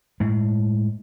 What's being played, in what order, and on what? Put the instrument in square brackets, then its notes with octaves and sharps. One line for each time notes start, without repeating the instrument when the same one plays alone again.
[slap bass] A2 G#3